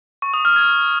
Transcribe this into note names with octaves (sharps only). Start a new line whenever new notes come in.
C#6
D#6
F6
G#6